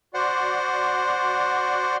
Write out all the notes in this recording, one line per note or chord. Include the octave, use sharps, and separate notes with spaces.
F#4 C5 D5 F#5 C6